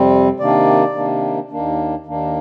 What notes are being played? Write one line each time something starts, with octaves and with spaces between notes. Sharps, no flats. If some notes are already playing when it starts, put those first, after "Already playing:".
Already playing: F2 C3 G3 C4
C3 D#3 A#3 D4 D5
C3 D#3 A#3 D4
D#2 D#3 A#3 D4
D#2 D#3 A#3 D4